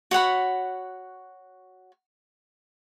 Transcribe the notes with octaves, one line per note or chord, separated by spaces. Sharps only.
F#4 C#5 F#5 B5